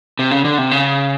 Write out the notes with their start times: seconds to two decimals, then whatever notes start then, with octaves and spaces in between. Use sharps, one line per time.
0.19 C3
0.31 C#3
0.45 D3
0.58 C3
0.71 C#3